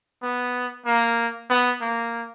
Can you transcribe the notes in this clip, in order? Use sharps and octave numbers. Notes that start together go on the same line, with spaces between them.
B3
A#3
B3
A#3